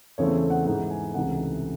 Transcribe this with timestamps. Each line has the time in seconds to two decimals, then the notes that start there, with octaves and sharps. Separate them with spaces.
0.18 E2 C#3 E3 A3 C4 C#5
0.50 F#5
0.66 G#2 E3 G#3 D#4 F#5
0.90 G#5
1.14 C#2 C3 E3 A3 D#4 F#5